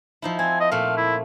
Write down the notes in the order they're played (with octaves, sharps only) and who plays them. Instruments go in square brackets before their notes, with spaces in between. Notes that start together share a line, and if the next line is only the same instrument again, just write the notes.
[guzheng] F3 D#4 E4
[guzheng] C4 [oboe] G#5
[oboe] D#5
[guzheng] A#2 A3 [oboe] F5
[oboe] E4